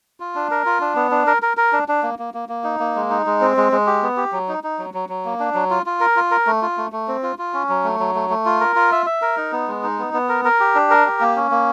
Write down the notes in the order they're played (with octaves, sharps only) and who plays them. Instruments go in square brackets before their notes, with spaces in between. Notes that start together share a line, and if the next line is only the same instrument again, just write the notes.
[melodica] F4
D4
A#4
F4
D4
B3
D4
A#4
A#4
A#4
D4
D4
A#3
A#3
A#3
A#3
D#4
A#3
G#3
D#4
G#3
C4
G#3
G#3
G4
B3
G4
F#3
D#4
D#4
F#3
F#3
F#3
A#3
D4
F#3
F4
F4
A#4
F4
A#4
A3
F4
A3
A3
C4
F4
F4
C#4
F#3
A3
F#3
A3
A3
F4
A#4
F4
E5
E5
A#4
D#4
B3
G#3
D#4
B3
B3
A#4
A#4
G4
D4
A#4
G4
A#3
C#4
A#3